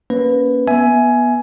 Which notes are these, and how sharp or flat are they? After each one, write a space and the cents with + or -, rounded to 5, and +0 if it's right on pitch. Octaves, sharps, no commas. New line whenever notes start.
A#3 +20 C#4 +0 B4 +5
B3 -20 E5 +0 G#5 +15